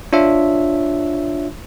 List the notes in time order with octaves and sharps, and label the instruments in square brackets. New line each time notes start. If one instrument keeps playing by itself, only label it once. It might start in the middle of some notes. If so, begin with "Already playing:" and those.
[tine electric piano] D4 F4 C#5 E5